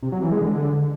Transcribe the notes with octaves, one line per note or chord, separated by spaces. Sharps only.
C3
F#3
E3
G#3
D3